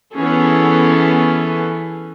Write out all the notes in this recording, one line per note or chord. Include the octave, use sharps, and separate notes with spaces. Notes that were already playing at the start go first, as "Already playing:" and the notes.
E3 B3 C#4 G#4 A4